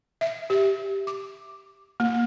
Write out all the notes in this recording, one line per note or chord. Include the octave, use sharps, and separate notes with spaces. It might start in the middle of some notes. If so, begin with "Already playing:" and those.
E5
G4
D6
A#3